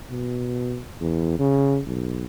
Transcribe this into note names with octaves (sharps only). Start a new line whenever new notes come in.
B2
E2
C#3
B1